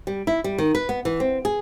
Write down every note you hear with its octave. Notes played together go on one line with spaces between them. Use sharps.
G3
E4
G3
D#3
B4
B3
E3
C4
G#4